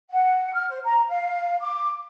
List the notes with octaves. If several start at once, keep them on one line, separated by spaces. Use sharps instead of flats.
F#5
F6
C5
A#5
F5
D6